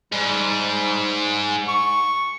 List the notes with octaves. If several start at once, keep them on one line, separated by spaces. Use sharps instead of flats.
G#2 G3
C#6